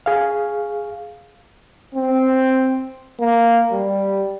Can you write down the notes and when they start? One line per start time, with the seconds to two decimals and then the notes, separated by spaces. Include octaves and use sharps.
0.06 G#4 F5
1.95 C4
3.20 A#3
3.72 G3